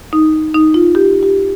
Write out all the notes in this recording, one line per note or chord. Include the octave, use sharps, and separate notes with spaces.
D#4
D#4
F4
G4
G4